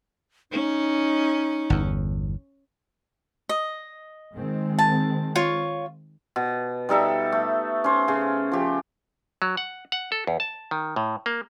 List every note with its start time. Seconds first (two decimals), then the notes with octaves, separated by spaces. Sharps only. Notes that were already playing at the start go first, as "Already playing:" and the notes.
0.52 C#4 D#4
1.70 G1 E2
3.49 D#5
4.33 D#3 G#3 C4
4.79 A5
5.35 F4 C#5
6.36 B2
6.89 G3 D#4 A4 E5
7.32 A3
7.84 C#4 C5
8.08 C#3
8.52 F3 G4
9.42 F#3
9.57 F#5
9.92 F#5
10.12 A4
10.27 E2
10.40 A5
10.71 D#3
10.96 A2
11.26 A#3